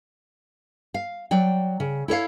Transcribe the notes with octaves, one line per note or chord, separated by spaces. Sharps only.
F5
F#3 D5 G5
C#3
E4 A4 C#5 F5